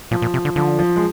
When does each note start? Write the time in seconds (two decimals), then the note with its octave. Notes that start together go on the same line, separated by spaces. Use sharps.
0.11 A#2 F3
0.22 A#2
0.34 C3
0.45 D3
0.56 D3 F3
0.79 F3
0.96 G#3